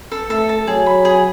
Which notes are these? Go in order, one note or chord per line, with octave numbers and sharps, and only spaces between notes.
A4
A3 A4
A5
F#3 G#4
B5
G#4